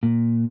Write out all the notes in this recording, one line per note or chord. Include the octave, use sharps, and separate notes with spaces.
A#2